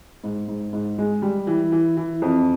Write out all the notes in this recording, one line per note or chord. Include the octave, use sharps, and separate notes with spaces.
G#2
G#2
G#2
G#3
G3
E3
E3
E3
F2